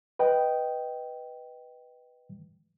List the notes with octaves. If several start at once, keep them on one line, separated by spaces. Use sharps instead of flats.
B4 D#5 G5